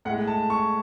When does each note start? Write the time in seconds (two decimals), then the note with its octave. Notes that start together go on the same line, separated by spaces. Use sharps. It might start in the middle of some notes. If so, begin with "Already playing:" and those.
0.05 A2 F#5
0.10 G#3
0.27 A5
0.50 C#6